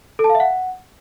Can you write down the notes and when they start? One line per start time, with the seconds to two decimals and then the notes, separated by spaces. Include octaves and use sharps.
0.19 A4
0.24 A5
0.29 F5
0.35 E5
0.40 F#5